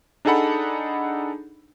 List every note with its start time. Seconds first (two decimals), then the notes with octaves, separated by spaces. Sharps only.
0.25 D4 D#4 G#4 A4 F#5 B5